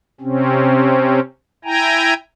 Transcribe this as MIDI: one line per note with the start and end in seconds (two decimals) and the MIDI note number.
0.21 1.20 48
0.21 1.20 60
0.21 1.20 61
1.65 2.14 64
1.65 2.14 79
1.65 2.14 80
1.65 2.14 82